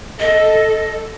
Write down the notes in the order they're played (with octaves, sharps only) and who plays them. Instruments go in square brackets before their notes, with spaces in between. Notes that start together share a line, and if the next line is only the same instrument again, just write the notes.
[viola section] A4 [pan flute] D#5